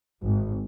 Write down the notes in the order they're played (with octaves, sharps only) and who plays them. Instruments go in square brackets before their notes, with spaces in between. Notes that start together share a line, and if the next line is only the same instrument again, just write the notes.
[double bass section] G#1